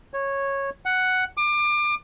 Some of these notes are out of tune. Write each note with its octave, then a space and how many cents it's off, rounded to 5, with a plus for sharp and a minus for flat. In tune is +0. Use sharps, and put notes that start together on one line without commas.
C#5 -10
F#5 +5
D6 +30